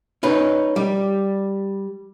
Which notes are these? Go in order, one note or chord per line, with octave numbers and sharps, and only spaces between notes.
C#4 D#4 B4
G3